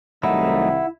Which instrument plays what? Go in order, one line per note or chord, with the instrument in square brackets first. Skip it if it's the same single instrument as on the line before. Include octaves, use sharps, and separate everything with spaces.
[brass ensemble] C2 D#3 [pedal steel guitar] F#3 A3 D#4 [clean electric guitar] E4 [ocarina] F#5